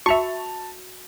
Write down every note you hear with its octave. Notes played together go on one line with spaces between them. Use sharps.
F#4 E5 A5 C#6 F7